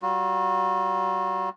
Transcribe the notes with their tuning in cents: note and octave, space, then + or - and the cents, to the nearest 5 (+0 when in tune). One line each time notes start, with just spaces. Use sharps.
G3 -45 F#4 -45